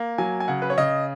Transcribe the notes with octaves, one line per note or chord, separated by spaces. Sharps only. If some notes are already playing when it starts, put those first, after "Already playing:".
Already playing: A#3
F#3 G#5
G#5
C#3 F#5
B4
C#5
C#3 D#5